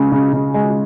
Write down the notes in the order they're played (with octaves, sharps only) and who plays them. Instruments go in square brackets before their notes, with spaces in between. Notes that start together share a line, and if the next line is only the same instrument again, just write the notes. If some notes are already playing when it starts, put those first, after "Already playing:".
Already playing: [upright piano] C#3 G#3
C#3
C#3
G#3